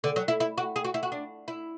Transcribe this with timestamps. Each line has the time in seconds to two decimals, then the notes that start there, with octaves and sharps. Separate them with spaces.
0.04 D3
0.16 F#3
0.28 E4
0.40 E4
0.58 F#4
0.76 G#4
0.85 F#4
0.94 E4
1.03 F#4
1.12 D4
1.48 E4